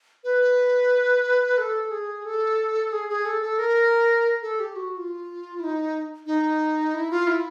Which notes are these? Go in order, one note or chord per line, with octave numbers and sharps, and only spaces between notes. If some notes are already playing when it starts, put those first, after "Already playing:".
B4
A4
G#4
A4
G#4
G#4
A4
A4
A#4
A4
G4
F#4
F#4
F4
E4
D#4
D#4
E4
F4
E4